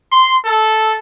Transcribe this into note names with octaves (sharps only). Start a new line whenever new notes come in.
C6
A4